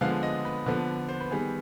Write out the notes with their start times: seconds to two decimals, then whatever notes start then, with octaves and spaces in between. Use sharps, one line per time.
0.01 D3 F3 G#3 B3 F5
0.23 D#5
0.45 B4
0.66 D3 F3 B3
1.08 C5
1.20 B4
1.31 D#3 G3 B3 G#4